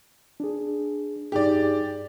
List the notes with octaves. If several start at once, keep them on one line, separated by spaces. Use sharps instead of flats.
D4 G#4
G2 D#4 G4 G#4 D5